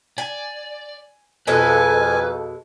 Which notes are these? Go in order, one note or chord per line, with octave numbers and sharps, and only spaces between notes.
D5 G#5
F2 B2 G#3 A4 B4 G#5